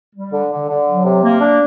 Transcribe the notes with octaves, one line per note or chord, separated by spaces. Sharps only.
G3
D3
D3
D3
F#3
C3
A#3
D4